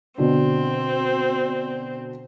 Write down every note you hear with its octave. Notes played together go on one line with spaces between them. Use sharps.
B2 D3 C4